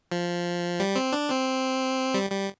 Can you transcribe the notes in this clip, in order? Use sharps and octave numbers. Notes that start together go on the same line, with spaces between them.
F3
G3
C4
D4
C4
G3
G3